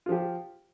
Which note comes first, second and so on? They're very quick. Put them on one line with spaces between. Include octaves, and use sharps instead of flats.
F4 F3 G4